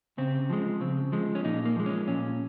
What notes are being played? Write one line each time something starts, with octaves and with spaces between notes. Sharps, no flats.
C#3 C4
F3 G#3
C#3 C4
F3 G#3
C#4
A#2 D#4
A#3
F3 G#3
C#4
A#2 C#4